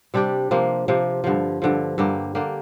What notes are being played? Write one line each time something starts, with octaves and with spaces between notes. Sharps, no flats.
C3 G3 D4 G4
C3 F3 A#3
C3 F3 A#3
G2 D3 F3
G2 D3 F3
G2 D3 A#3 G4
D3 A#3 G4